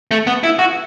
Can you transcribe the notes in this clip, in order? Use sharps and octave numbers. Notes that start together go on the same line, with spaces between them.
A3
B3
E4
F#4